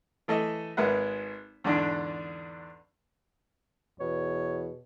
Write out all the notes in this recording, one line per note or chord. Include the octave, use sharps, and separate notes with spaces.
E3 A3 A4 D#5
G#1 G#3 A#4 B4 E5 F#5
E2 G#2 D3 D4
E2 B2 C#5